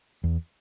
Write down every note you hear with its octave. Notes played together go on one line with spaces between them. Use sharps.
E2